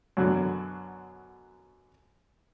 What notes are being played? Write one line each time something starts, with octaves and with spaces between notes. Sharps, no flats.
F#2 B2 D3 F#3